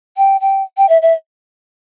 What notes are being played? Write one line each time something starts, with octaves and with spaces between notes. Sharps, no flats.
G5
G5
G5
E5
E5